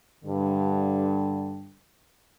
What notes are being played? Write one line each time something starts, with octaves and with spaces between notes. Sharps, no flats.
G2 D3